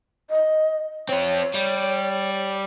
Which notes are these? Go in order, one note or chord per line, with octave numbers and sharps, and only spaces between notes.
D#5
C4 F4 C#5
G3